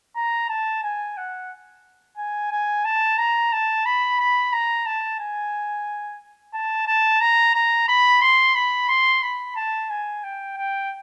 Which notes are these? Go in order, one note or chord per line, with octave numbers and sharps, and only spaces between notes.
A#5
A5
G#5
F#5
G#5
G#5
A5
A#5
A5
B5
B5
A#5
A5
G#5
A5
A5
A#5
A#5
B5
C6
B5
C6
B5
A5
G#5
G5
G5